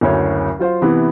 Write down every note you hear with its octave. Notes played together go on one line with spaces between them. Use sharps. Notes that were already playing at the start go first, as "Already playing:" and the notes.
F#1 D2 F#3 C#5
F#3 F4 C5 F5
C3 E3 B3 E4